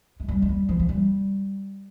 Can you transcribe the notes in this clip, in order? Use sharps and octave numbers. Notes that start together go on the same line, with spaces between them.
G#3
G3
G#3
G3
F3
F3
G3